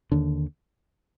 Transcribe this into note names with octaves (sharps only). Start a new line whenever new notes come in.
D#2 D3